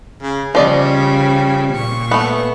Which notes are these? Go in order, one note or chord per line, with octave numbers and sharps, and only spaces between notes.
C#3
C#3 F3 G3 D5 D#5
A#2 C#6
A3 B3